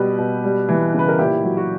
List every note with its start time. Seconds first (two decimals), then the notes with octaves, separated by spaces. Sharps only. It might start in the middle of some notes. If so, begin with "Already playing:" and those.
Already playing: B2 G3 G4 B4
0.18 B2
0.44 G3
0.69 E3
0.94 C#3 B4
1.08 A#4
1.19 A#2 E4 G4
1.44 F#3
1.57 F#4